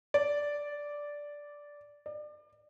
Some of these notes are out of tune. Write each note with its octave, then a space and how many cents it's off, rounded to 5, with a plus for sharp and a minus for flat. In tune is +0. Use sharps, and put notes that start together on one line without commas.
D5 -5
D5 +35